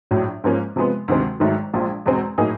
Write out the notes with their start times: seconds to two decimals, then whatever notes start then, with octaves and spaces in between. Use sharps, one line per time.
0.11 A#1 A2 F#3
0.44 G#2 F3 A#3 C#4
0.76 C3 F3 G#3 B3
1.08 D2 C3 D#3 G#3 C4
1.40 G#1 G#2 D#3 F#3 A3
1.74 A#1 A#2 F3 G#3
2.06 E2 B2 G#3 C4
2.38 A2 F#3 A#3 D#4 G#4